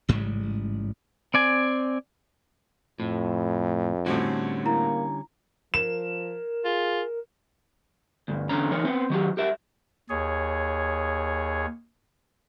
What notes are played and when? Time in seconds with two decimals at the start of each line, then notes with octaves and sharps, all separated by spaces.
0.08 A1 G#2 C#3 G3
1.34 C4 D5 G#5
3.00 F2 A2
4.06 A2 D3 G3 C4 C#4 F#4
4.66 A#3 E4 A#5
5.74 F3 A#4 E7
6.65 F4 G#4
8.28 D2 G2
8.49 E2 D3 C#4 A#5
8.72 E3 D#4 A#4 C#5
8.85 B3 C4
9.10 D#3 F#3 G4
9.37 G4 A#4 E5
10.10 D#2 G#4 C#5